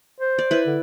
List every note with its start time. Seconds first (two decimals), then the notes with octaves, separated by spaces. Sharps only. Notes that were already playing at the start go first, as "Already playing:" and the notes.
0.20 C5
0.38 D5
0.51 E4 B4
0.66 D3